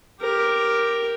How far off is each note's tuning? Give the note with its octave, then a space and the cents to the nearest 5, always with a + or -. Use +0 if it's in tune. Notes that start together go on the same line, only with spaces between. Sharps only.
G4 +0 A#4 +0